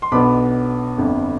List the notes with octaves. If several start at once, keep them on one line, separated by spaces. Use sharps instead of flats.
C6
B1 B2 B3 D4 B5 D6
G1 F2 D3